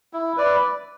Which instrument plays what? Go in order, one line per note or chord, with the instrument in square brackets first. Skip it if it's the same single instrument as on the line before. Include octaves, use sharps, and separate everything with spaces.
[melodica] E4
B4 D5